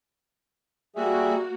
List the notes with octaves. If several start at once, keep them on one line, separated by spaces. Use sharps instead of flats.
G3 A#3 F#4 G#4 E5